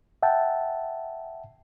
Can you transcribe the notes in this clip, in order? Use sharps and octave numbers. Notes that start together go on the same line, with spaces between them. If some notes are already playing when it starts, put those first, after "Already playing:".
E5 F#5 G5 A5